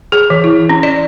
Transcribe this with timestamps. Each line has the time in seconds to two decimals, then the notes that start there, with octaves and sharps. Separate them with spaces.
0.12 G#4
0.30 E3
0.44 E4
0.69 C#4
0.83 D5